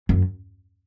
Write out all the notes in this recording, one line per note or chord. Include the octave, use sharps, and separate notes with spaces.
F#2